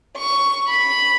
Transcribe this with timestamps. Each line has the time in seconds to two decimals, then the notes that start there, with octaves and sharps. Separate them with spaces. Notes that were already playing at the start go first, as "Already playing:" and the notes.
0.17 C#6
0.68 B5